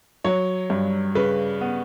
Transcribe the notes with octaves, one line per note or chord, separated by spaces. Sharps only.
F#3 C#5
G2
C#3 B4
B3